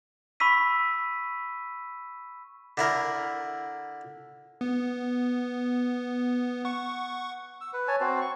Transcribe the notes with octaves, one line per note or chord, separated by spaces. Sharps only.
B5 C#6 E6 B6 D#7
D3 E4 A#4
B3
F#5 C#6
E6
B4
C#5 G#5 A5
C4 F#4 C5
C#6